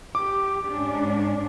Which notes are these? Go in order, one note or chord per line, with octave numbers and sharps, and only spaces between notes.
G4 D6
G#2 C#4 D4